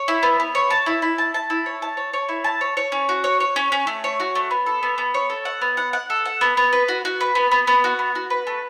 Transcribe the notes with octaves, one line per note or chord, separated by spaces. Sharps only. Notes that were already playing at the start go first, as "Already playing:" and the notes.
Already playing: C#5
E4
B3
B3
C#5
A5
E4
E4
A5
A5
E4
C#5
A5
C#5
C#5
E4
A5
C#5
C#5
C#4
F#4
C#5
C#5
C#4
C#4
A3
C#5
F#4
A3
B3
A4
B3
B3
C#5
A4
F#5
B3
F#5
F#5
A4
F#5
B3
B3
B4
F#4
F#4
B4
B3
B3
B3
F#4
B3
F#4
B4
A3